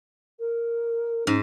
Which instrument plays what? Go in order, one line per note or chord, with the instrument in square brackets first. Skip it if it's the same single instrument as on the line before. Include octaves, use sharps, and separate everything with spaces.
[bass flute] A#4
[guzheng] G#2 [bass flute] C#4